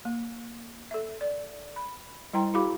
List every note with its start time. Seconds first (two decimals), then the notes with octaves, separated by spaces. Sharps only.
0.05 A#3
0.91 A4 E5
1.21 D5
1.76 B5
2.33 G3 E4 C5 G5 A#5 C6
2.54 E4 F#4 G#4 F5 B5 D6